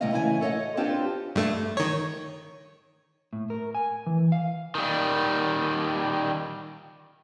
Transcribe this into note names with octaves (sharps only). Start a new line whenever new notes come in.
A2 C3 G3 G4 D#5 F5
A2 C#3 E3 E4 A4 G#5
A4 C#5 D#5 F#5
C4 D4 F4 G4 B4 C5
G2 A3
D#3 C#5
A2
A#4
G#5
E3
F5
D#3 G3